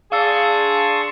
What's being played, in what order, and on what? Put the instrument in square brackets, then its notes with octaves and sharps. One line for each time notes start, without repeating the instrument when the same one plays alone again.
[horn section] D4 G#4 [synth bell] F5 E6 [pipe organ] A5 C6 C#6